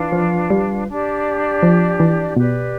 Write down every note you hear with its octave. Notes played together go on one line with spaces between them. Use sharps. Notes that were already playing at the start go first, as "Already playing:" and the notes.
Already playing: E3 D4 F4 B4 F5
F3
G3
D4 G4 D5
F3
E3
B2 G4 B4 D5